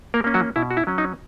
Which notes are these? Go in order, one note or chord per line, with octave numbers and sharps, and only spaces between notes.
A#3 A#4
A#3 C#4
F#3 F#4
B2 E4
F#4
E4
F#3 C#4
D#4